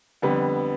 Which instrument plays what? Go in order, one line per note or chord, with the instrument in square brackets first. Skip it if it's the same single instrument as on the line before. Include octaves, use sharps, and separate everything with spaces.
[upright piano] F2 D3 G3 B3